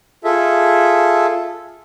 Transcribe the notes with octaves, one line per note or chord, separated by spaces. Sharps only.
F4 G#4 A4 E5